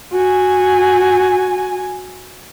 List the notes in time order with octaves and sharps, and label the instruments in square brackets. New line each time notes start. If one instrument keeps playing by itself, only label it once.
[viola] F#4 G#5